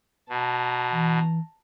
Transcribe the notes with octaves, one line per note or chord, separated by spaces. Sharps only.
B2 A5 A#5
E3